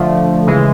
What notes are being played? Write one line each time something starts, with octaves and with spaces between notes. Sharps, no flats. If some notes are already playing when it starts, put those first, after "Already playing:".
Already playing: D3 F3 A3
C#3 E3 G#3